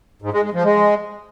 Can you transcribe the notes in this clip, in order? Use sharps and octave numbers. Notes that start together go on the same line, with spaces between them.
G#2
G#3
G#3
F3
G#3